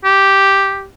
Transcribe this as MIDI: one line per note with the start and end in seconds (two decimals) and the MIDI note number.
0.04 0.86 67